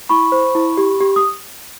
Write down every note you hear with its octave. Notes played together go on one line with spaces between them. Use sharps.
E4 B5 C#6
C5
E4
G4
G4
D#6